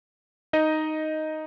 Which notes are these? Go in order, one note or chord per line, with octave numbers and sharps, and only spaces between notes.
D#4 D#5